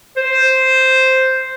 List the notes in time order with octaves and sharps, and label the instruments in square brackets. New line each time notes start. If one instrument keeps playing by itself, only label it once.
[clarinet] C5